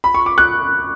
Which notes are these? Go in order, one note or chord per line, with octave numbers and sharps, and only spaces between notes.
B5
C#6
D6
F#6